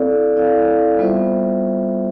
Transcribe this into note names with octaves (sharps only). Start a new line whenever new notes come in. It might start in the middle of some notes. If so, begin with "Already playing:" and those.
Already playing: C4 E4 A4 D5 F5
C4 E4 A4 D5 F5
G3 B3 F4 C5 E5